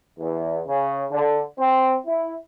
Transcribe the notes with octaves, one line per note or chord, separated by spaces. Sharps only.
E2
C#3
D3
C4
E4